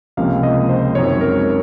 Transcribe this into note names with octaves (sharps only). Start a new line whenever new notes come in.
C#2 C3 F3 A#3 C#4 F5
D#5
C5
F#2 D#3 G#3 C4 C#5
A#4